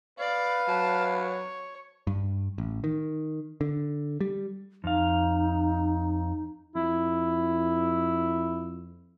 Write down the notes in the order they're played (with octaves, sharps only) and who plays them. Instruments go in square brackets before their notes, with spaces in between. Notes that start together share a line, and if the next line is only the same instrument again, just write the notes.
[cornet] B4 [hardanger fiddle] D5 [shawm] F5
[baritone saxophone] F#3 [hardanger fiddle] A5
[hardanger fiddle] C#5
[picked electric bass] G2
A1
D#3
D3
G3
[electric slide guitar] F2 F5 [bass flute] D#4
[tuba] F2 [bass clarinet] E4